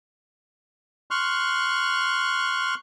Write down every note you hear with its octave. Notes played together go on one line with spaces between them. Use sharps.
C6 C#6 F6 F#6